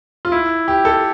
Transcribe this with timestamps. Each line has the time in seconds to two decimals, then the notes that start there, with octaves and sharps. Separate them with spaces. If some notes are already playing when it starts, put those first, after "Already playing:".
0.25 F4
0.32 E4
0.68 G4
0.85 A4